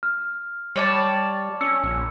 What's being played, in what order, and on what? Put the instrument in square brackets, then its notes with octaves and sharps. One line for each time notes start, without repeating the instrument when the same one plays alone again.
[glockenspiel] F6
[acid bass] G3 [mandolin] C#5 D5 A5
[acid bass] C#4 [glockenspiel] E6 C#7
[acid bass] A#1